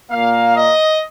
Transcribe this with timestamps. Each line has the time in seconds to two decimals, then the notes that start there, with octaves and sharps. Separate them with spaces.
0.11 A#2 A#3 F5
0.56 D#5